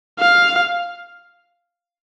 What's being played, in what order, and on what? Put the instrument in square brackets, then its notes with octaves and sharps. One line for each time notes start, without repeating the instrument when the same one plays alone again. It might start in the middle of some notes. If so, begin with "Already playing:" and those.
[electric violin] F5